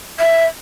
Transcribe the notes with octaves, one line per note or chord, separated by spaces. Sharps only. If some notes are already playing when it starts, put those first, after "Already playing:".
E5